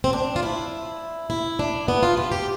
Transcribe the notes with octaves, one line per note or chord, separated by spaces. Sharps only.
C4
D4
F4
E4
E4
D4
B3
F4
G4
G4